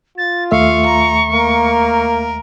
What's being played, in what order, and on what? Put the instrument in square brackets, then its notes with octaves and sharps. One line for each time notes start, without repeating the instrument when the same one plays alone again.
[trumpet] F4 [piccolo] A6
[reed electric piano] D#2 A3 E5 [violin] F5 [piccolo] C#6
[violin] A#5
[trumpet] A#3 [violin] A#4